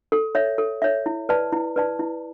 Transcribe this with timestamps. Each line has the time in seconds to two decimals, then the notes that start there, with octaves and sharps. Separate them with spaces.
0.12 A4
0.35 C#5 E5
0.58 A4
0.82 C#5 E5
1.06 E4
1.29 B4 D5 A5
1.52 E4
1.76 B4 D5 A5
1.99 E4